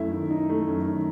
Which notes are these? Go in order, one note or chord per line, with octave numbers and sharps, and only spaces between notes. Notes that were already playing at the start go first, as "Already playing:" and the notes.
Already playing: F#2 A3 E4 E5
D#3
D#4
A3
F#2
D#3